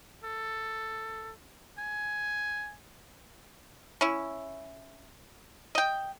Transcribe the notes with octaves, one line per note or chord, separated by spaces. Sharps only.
A4
G#5
C#4 E4
D#5 G5